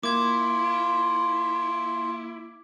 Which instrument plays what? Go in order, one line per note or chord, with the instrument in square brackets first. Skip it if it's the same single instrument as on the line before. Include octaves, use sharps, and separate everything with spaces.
[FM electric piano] A#3 [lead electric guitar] E4 [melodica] F4 [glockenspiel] D6 G#6